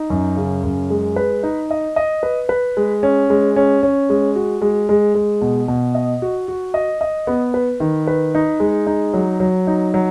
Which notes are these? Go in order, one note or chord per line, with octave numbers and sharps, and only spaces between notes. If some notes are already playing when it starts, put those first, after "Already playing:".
Already playing: D#4
F#2
C#3
F#2
G#3
B4
D#4
D#5
D#5
B4
B4
G#3
C#4
G#3
C#4
C#4
G#3
F#4
G#3
G#3
G#3
B2
B2
D#5
F#4
F#4
D#5
D#5
B3
B4
D#3
B4
D#4
G#3
D#4
F#3
F#3
D#4
F#3